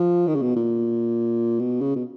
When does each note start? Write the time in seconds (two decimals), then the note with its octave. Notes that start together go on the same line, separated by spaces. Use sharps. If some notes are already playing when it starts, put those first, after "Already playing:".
Already playing: F3
0.28 D#3
0.35 C#3
0.42 B2
0.56 A#2
1.59 B2
1.81 C#3
1.96 B2